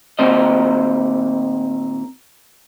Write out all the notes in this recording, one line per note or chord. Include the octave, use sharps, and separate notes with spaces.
A#2 D#3 C4 D#5